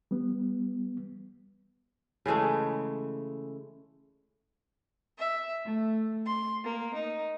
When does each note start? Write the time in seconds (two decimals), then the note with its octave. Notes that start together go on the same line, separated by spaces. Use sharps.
0.11 G3 B3
2.26 C#3 E3 G#3 A3
5.18 E5
5.64 A3
6.26 C6
6.63 A#3
6.94 D#4